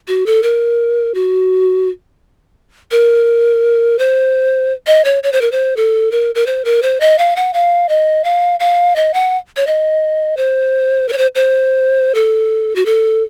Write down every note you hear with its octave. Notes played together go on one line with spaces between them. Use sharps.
F#4
A4
A#4
F#4
A#4
C5
D#5
C#5
C#5
C5
A#4
C5
A4
A#4
A#4
C5
A#4
C5
D#5
F5
F#5
F5
D#5
F5
F5
D#5
F#5
C#5
D#5
C5
A#4
C#5
C5
C5
A4
F#4
A4